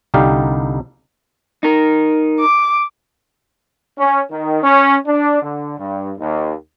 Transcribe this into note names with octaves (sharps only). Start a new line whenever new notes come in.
C2 D3 G3 D#4 G4 F5
D#4 A#4
D6
C#4
D#3
C#4
D4
D3
G2
D#2